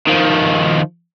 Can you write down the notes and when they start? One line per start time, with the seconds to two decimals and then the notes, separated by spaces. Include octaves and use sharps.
0.07 D#3 F3